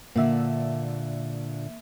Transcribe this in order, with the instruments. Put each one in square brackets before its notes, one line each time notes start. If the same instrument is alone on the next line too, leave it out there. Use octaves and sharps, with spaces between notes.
[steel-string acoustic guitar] A#2 D3 D4 [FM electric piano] A#3 E5